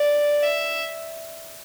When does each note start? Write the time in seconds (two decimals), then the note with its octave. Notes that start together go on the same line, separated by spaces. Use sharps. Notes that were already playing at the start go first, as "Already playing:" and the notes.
Already playing: D5
0.43 E5